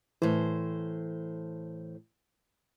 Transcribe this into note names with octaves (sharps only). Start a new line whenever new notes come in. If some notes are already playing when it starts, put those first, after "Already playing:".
A2 E3 C5